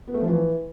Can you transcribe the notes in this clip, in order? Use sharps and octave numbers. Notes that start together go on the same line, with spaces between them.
B3
A3
F3
E3